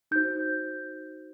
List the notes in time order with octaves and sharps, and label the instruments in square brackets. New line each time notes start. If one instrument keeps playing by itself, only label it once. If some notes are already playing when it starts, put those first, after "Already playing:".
[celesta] D#4 F#4 C5 G6